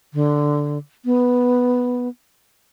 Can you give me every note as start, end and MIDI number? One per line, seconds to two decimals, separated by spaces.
0.14 0.78 50
1.05 2.08 59